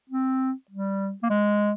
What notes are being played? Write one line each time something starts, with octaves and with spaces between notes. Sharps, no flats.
C4
G3
A#3
G#3